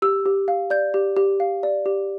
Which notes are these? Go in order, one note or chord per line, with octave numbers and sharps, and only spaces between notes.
G4 E6
G4
F5
D5 G6
G4
G4
F5
D5
G4